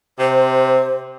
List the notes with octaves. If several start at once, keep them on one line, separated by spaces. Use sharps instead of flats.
C3 C5